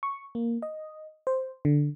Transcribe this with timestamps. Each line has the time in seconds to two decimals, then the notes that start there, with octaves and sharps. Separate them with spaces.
0.03 C#6
0.35 A#3
0.62 D#5
1.27 C5
1.65 D3